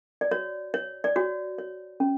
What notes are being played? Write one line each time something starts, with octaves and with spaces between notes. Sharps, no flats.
D5
F#4 C#5
C#5
D5
F#4 C#5
C#5
C#4